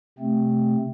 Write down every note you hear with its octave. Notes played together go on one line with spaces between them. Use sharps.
C3 A3 C4